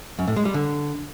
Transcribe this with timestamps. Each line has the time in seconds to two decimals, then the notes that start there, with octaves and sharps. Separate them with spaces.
0.19 F#2
0.28 A2
0.36 G#3
0.45 G3
0.54 D3